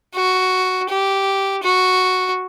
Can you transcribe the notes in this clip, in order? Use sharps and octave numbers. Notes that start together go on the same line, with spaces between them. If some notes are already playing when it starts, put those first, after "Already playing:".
F#4
G4
F#4